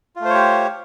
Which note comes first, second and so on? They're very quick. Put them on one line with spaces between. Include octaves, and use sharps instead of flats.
F4 A3 C5 C#5 G4